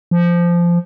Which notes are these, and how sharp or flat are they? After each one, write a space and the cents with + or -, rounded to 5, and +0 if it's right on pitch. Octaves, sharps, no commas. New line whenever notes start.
F3 -15